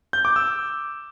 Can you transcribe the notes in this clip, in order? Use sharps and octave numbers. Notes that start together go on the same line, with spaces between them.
G6
D6
E6